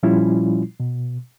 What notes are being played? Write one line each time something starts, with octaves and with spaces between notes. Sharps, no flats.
A#2 F3 G3 C#4 E4 F4
B2